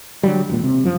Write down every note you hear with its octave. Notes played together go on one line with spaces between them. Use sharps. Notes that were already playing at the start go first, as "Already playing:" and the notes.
D3 F#3 G3
E1 A#2
C3
F#2 F3